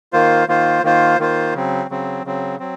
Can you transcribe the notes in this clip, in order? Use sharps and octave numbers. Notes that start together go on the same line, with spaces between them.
D#3 A#3 F4 C5
D#3 A#3 F4 C5
D#3 A#3 F4 C5
D#3 A#3 F4 C5
C#3 F#3 C4
C#3 F#3 C4
C#3 F#3 C4
F#3 C4